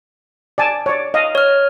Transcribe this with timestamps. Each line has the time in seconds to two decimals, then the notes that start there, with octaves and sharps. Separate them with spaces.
0.58 D5 G#5 A5
0.86 C#5 D5
1.14 D#5 F5
1.35 C#5 F6